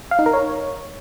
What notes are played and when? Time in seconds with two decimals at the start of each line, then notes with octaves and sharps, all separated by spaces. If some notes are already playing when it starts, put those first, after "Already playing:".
0.11 F5
0.19 D#4
0.26 A#4
0.33 C#5